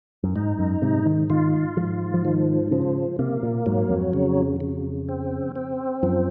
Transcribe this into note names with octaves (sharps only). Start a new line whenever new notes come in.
F#2
G#2 D#4
F#2
G#2 C3
D#3
D#3 F4
G#2 F3
F3
D#3 F3
C#3 F3
C3 A#3
A#2
G#2 F#3
F2
C#3
C#3
C4
C4
F#2 F3